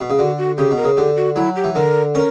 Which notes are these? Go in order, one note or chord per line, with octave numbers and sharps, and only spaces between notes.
B2
C#3
D3 F#4
F#4
C#3 G4
B2
A#4
C#3
D3 G4
F#4
F#3 E4
G4
E3
D3 A#4
C#4 A#4